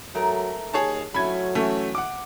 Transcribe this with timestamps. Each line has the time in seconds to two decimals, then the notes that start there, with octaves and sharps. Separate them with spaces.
0.15 G#2 F#3 A3 A#4
0.74 D#2 G#4 C#5 A5
1.14 F#3 A3 C#4 E4 B5 G#6
1.55 E3 A3 C#4
1.95 F#5 D6